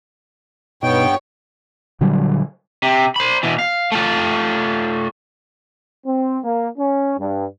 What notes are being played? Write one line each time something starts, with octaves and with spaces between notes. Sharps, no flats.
G2 B2 B3 D#4 C#5 G5
A#2 D3 F#3 G3
C3
C5 B5
B2 E3
F5
A3 F4
C4
A#3
C#4
G2